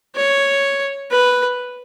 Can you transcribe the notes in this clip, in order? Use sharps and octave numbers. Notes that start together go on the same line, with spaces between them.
C#5
B4